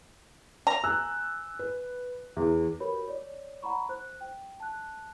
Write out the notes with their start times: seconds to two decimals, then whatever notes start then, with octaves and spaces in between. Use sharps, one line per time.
0.67 A#5
0.84 G#5 E6 F#6
1.59 B4
2.37 E2
2.80 F#4 G4 A#4 B4 C#5 B5
3.08 C#5 D5
3.63 F#5 A#5 B5 C#6
3.89 C5 F#6
4.21 G5
4.60 A5 F#6